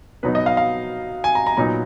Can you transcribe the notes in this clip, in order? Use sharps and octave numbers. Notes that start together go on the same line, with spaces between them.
B2 F#3 B3 D#4 B4
D#5
F5
F5
G#5
A#5
A#5
A#2 F#3 B3 D#4 A#5